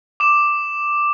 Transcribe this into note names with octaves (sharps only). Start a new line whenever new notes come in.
D6 E7